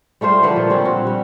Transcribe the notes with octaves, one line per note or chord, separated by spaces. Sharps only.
G3 A3 F4 C5
D3 F3 B4 F#5
A#2
G3 C4 C#4
F#4
G3